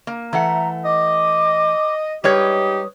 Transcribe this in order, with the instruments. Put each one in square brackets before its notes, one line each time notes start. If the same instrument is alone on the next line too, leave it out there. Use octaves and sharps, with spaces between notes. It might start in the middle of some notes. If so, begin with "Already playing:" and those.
[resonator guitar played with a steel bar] A#3
[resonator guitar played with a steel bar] E3 A3 F#5 [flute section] E5 A#5
[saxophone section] D#5 [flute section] D6
[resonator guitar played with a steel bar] G3 B4 C#5 [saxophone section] G#3 D#4 G4 [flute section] D#6